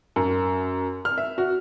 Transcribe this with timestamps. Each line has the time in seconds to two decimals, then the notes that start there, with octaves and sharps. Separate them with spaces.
0.16 F#2
1.05 F6
1.18 E5
1.38 F#4